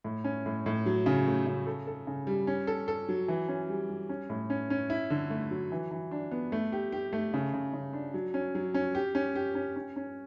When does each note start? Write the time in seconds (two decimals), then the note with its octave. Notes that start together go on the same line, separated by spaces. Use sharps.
0.04 A2
0.24 C#4
0.46 A2
0.66 A2
0.86 F#3
1.06 C#3
1.26 A3
1.47 C#3
1.67 A4
1.87 A4
2.07 C#3
2.27 G3
2.47 C#4
2.67 A4
2.88 A4
3.09 F#3
3.28 E3
3.49 C#4
3.69 G3
3.89 G3
4.09 C#4
4.30 A2
4.50 C#4
4.70 C#4
4.90 E4
5.10 D3
5.30 A3
5.51 F#3
5.72 E3
5.91 E3
6.11 D4
6.31 B3
6.52 A3
6.72 G4
6.92 G4
7.13 A3
7.34 C#3
7.53 C#3
7.73 C#3
7.93 D4
8.14 F#3
8.34 C#4
8.55 F#3
8.74 C#4
8.95 G4
9.15 C#4
9.35 G4
9.55 C#4
9.76 C#4
9.96 C#4